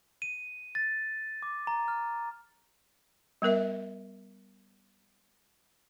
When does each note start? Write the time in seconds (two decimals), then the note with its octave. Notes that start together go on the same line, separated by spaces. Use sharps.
0.22 D#7
0.75 A6
1.43 D6
1.67 A#5
1.88 F6
3.42 G3 B3 A#4 E5